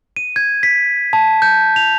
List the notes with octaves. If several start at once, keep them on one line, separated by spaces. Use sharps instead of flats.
D#7
G#6
B6
A5
G6
F7